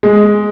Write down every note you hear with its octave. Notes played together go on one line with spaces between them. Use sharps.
G#3